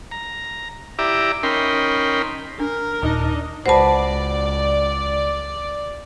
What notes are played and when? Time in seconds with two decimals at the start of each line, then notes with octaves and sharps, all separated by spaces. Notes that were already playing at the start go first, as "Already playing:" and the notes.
0.11 A#5
0.99 E4 G4 D5 E5 A#5 D6
1.43 C#4 D#4 A#4 G5 B5 C6
2.60 D4 A#4
3.03 D#1 D4 D#4 D#5 A#5
3.66 C#2 F#4 B4 C5 D5 A5